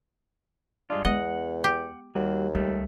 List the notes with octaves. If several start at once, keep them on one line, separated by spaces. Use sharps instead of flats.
G2 G#3 D4 F4
E2 G#3 B3 D#5 F#5
G4
D#2 G3 F#4
C#2 G3 A3